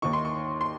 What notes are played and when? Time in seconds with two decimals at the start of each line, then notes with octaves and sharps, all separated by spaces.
0.02 D#2 D#3 A#3 D#4 C#6
0.13 C6
0.25 C#6
0.61 C6